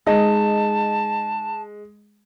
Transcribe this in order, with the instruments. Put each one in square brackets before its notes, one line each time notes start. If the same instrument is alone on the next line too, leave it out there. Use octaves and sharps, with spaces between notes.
[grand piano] G#3 [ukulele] D#4 D#5 [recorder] A5